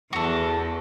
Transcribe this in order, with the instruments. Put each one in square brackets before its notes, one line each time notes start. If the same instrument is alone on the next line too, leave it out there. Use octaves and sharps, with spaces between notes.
[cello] E2 [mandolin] F#4 A4